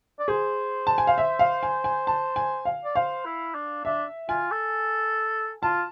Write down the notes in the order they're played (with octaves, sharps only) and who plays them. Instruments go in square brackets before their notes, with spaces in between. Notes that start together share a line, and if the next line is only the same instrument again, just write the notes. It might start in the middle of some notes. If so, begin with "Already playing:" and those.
[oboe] D5
[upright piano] G#4 [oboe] C5
[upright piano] A5
G#5
F5
E5
F5
G#5
G#5
A5
G#5
F5
[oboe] D5
[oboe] C5 [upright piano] F5
[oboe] E4
D4
[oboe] D4 [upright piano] E5
[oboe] F4 [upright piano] G#5
[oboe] A4
[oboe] F4 [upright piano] A5